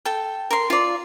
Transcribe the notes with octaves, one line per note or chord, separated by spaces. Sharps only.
A4 G5
A#4 C6
F4 D5